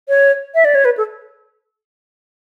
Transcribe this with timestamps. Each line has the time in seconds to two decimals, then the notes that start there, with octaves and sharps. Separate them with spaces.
0.09 C#5
0.55 E5
0.65 D5
0.75 C#5
0.85 B4
0.97 A4